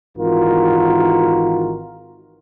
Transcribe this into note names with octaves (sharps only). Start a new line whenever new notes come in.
G#1 D#3 E3 F4 F#4 A#4